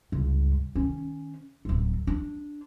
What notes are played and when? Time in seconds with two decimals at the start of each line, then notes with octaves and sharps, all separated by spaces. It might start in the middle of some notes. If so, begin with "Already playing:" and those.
0.12 C#2 G2
0.75 D#3 C#4
1.65 D1 F#3
2.07 D4